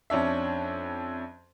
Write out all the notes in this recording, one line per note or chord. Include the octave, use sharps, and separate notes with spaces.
F2 C#4 D4 E5